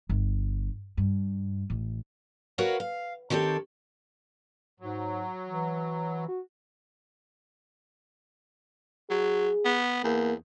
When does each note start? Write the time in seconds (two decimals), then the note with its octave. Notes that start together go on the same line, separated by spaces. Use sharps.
0.09 G1
0.97 G2
1.70 A1
2.58 F#4 A#4 B4 C#5 F5 F#5
2.80 F5
3.30 D#3 C4 G4 A4 C#5
4.80 G#2 F#3
5.48 E3
6.28 F#4
9.10 F#3 G#4
9.65 B3
10.04 E2 A#3